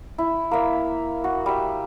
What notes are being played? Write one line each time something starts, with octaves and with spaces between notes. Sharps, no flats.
E4
A#3 E5
F#4
G3 E5